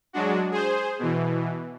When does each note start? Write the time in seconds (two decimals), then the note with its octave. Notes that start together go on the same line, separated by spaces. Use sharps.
0.13 F#3 G#3 D4 F#4
0.51 G#4 C5
0.99 B2 E3